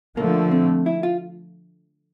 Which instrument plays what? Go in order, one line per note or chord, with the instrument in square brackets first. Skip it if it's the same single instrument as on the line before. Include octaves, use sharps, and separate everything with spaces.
[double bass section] D3 F3 A3 [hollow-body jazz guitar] A#3
[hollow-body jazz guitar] C4
E4
F4